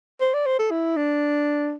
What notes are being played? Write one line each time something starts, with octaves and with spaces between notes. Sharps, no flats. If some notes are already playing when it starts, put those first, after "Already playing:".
C5
D5
C5
A4
E4
D4